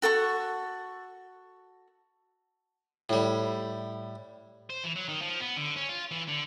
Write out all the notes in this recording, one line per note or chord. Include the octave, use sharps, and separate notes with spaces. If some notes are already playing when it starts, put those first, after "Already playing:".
F#4 A4 F#5 C#6
A2 G3
C5
E3
F#3
D#3
F3
B3
D3
C#4
F4
E3
D3